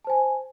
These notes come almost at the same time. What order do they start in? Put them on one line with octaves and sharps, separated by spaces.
A5 C5 G#5